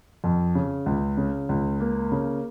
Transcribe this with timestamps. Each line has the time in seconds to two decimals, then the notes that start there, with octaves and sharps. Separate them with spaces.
0.24 F2
0.55 C#3
0.86 C#2
1.17 C#3
1.49 C#2
1.80 A#3
2.12 C#3